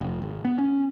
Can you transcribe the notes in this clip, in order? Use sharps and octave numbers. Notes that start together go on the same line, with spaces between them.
F1
G#1
B3
C#4